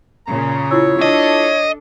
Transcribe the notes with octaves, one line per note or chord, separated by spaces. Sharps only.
A#2 C#3 A#5
E4 F4 C#5 E6
D4 A4 D#5